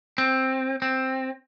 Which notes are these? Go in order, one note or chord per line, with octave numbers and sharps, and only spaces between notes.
C4
C4